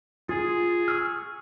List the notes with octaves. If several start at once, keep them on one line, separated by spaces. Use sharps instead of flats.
F4 G#4
C#6 E6 F6